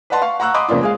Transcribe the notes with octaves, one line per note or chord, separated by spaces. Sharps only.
B4 D5 D#5 F#5 A5 C6
F5 C#6
F#5 A#5 C#6 E6 F#6
D#5 B5 C6 D6 D#6
F2 C#3 A#3 C#4 D4 F4
G#3 G#4 F5